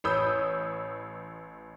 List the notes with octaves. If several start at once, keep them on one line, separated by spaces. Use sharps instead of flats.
A1 C#5 B5 D#6 E6 G6